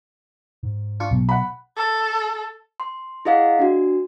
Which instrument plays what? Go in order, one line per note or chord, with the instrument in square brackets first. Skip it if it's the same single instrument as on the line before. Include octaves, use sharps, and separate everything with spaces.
[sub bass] G#2
[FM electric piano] D4 F4 C#6
B1
[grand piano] F#5 B5
[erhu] A4
[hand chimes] C6
E4 G#4 D#5 F5 F#5
D4 F#4